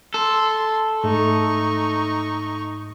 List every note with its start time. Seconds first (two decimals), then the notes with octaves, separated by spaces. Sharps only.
0.14 A4 C6
1.04 G#2 A3 D#4 C#6